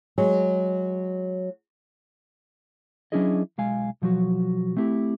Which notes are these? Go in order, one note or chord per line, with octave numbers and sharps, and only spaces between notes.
F#3 G#3
F#3 C#4 D4 E4 G#4 D#5
B1 G#3 F5 G#5
B2 F3 F#3 F#4
A3 C4 E4 G4